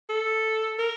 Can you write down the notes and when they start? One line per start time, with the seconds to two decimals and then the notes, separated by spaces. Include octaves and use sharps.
0.09 A4
0.79 A#4